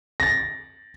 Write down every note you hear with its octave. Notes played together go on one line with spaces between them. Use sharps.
A6 A#6